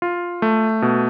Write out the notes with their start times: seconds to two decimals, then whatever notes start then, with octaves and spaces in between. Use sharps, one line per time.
0.02 F4
0.42 A3
0.82 B2